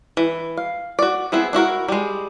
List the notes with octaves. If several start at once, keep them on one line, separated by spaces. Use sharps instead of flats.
E3
F5
F#4 D5
B3 C4 E4 G#4
D4 E4 F#4 A#4
G3 G#3